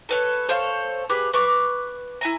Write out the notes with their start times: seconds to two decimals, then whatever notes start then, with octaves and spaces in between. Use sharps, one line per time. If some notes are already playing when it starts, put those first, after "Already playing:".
0.09 A4 B4 C#5
0.49 A4 C5 C#5 F5
1.10 G4 G#4 B4
1.33 B4 C#6 D6
2.21 E4 G#5 A#5